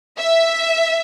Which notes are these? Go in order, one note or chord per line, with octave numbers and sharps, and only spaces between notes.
E5